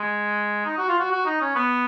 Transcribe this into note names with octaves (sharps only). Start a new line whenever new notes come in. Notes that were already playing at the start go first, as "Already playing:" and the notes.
Already playing: G#3
D#4
F#4
F4
F#4
F#4
D#4
C#4
B3